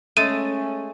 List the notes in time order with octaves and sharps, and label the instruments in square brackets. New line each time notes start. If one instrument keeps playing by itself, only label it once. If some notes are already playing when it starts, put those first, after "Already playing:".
[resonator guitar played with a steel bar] G#3 A3 [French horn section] C#4 [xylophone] D#7